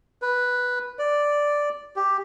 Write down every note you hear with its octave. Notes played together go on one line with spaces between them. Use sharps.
B4
D5
G4